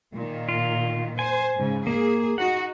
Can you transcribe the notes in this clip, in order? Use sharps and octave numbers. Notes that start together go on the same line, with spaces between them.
A#2 D#3
F4
C5 G#5
G#2 C#3
A#3 G#4
D#4 F#4 F#5